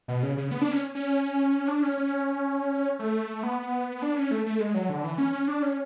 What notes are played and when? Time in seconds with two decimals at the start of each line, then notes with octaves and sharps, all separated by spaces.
0.08 B2
0.23 C#3
0.37 C#3
0.51 B3
0.61 D4
0.71 C#4
0.95 C#4
1.68 D4
1.83 C#4
1.98 C#4
2.99 A3
3.43 B3
4.02 D4
4.16 C#4
4.31 A3
4.46 A3
4.60 G#3
4.74 F#3
4.90 D3
5.04 E3
5.18 C#4
5.33 C#4
5.48 D4
5.62 C#4